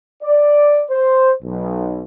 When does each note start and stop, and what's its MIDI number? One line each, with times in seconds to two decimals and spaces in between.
0.23 0.82 74
0.90 1.33 72
1.43 2.01 35